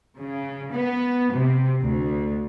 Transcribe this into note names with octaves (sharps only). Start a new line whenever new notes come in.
C#3
B3
C3
D2